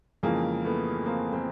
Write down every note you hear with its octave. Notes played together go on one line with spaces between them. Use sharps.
F2 C#3 E3 G#3 A#3
A3 B3
A#3 C4
A#3 C4